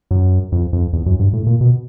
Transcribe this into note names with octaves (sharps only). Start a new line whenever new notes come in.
F#2
F2
F2
E2
F#2
G2
A2
A#2
B2